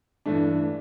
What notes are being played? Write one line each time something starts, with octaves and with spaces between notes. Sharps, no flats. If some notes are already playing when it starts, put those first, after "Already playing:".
G2 E3 A3 D4